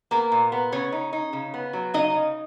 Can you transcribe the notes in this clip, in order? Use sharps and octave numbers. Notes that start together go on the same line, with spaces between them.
A#3 B3 A#4
A#2
B3
C#3 C#4 C#5
D#4
D#4
C#3
B3
F#3
C#3 D#4 D#5
C#3